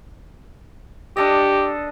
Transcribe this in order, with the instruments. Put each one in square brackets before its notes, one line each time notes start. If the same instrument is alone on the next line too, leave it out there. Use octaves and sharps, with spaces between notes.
[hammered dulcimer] D4 A4 D#5 [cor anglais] G4